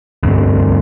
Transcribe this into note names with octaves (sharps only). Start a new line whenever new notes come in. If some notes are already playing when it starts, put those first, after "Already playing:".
D2 G2 C4